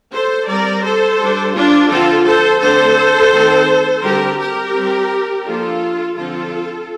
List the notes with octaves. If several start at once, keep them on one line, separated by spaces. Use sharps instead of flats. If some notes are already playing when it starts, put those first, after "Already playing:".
A4 C5
G3 C4 A#4 D5
A4 C5
G3 D4
D4 F4
D3 F3 C4 F4 A4
A4 C5
D3 A3 C4 A4 C5
D#3 A3 C4
D3 G3 C4 G4 A#4
G4 A#4
G3 C4
F3 A#3 D4 F4 A4
D3 F3 C4 F4 A4